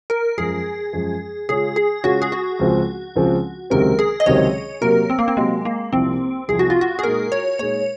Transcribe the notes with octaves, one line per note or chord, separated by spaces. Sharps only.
A#4
F#2 F3 G#3 G#4
F#2 F3 G#3
C#3 G#3 C#4 F4 G#4
G#4
C#3 G#3 C#4 F4 F#4
G#4
F#4
C#2 C#3 F3 C4 F4
C#2 C#3 F3 C4 F4
C#2 C3 D#3 F#3 C4 A#4
G#4
D#5
C#2 C3 D#3 F#3 C4 C#5
C3 F#3 A#3 A#4
C4
A#3
C4
C3 F#3 G#3 A#3
A#3
C2 C3 F3 C4
C2 C3 F3 G#4
F#4
F4
F#4
G#4
A#2 G#3 D#4 A#4
C#5
A#2 G#3 D#4 C#5